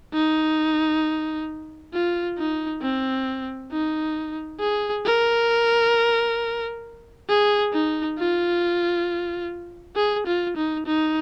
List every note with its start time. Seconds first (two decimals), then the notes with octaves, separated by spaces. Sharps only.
0.14 D#4
1.93 F4
2.38 D#4
2.82 C4
3.72 D#4
4.60 G#4
5.06 A#4
7.29 G#4
7.73 D#4
8.19 F4
9.96 G#4
10.27 F4
10.57 D#4
10.86 D#4